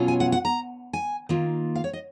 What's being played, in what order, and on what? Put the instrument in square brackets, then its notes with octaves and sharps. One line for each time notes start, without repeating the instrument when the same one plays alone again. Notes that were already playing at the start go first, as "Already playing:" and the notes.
Already playing: [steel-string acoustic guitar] B2 F#3 C#4 F4
G#5
F#5
F#5
A#5
G#5
D#3 A#3 F4
F5
C#5
D#5